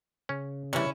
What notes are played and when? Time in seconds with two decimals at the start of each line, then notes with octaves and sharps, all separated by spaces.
0.29 C#3 C#4
0.73 C3 E3 G3 C#4 E4